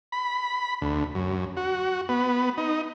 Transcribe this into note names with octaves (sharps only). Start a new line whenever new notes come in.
B5
D2
F#2
F#4
B3
D#4